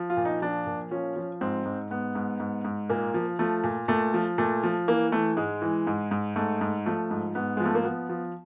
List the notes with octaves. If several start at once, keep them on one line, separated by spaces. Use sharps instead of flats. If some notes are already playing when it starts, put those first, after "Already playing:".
Already playing: F3
F4
A#2
D#4
F3 D4
A#2
F3 C#4
F3
G#2 C4
G#2
G#2 B3
G#2
G#2
G#2
A#2 A#3
F3
F3 A3
A#2
A#2 A3
F3
A#2 A3
F3
E3 A#3
E3 A3
G#2 G#3
E3
G#2
G#2
G#2 A3
G#2
F3 A3
G#2
G#2 B3
F3 G#3
A3
A#3
F3 B3
F3